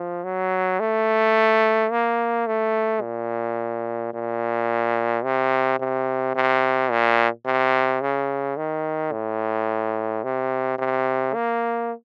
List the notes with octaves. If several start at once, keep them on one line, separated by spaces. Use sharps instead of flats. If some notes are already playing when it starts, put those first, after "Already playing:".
Already playing: F3
F#3
A3
A#3
A3
A#2
A#2
C3
C3
C3
A#2
C3
C#3
D#3
A2
C3
C3
A#3